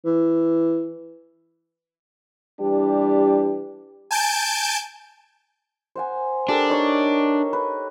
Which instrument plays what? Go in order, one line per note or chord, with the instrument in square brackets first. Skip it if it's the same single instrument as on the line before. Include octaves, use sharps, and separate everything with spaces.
[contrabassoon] E3
[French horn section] E3 G3 D4 G4
[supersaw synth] G#5 A5 G6 D7
[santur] C5 F#5 G#5
[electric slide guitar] D4 [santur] G4 A4 A#4
[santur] D#4 C#5 D#6
B4